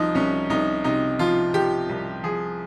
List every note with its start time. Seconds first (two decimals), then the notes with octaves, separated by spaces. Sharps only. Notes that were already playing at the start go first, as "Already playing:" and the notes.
Already playing: C2 F3 D#4
0.15 C2 C#4
0.50 C2 D#4
0.84 C3 D#4
1.19 F3 F4
1.54 F3 G4
1.89 C2
2.23 F3 G#4